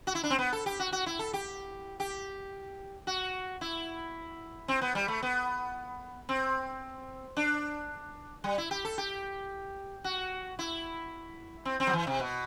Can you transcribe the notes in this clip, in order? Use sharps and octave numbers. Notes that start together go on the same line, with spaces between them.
F#4
E4
D4
C4
B3
A4
G4
F#4
F#4
E4
A4
G4
G4
F#4
E4
C4
B3
G3
A3
B3
C4
D4
G3
E4
G4
A4
G4
F#4
E4
C4
C4
F#3
E3
C3
B2